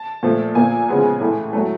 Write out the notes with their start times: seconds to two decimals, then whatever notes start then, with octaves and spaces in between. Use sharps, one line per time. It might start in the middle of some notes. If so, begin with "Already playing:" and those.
Already playing: A5
0.23 A#2 F3 A3
0.55 A#2 F3 A#3 G#5
0.88 C#3 F3 G#3 B3
1.20 A2 E3 A3
1.53 A2 F#3 A3